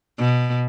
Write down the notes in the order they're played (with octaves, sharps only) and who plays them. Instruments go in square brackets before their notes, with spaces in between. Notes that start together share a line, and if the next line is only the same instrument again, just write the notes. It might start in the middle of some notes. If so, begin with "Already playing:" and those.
[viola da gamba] B2